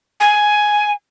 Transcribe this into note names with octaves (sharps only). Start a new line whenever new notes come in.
G#5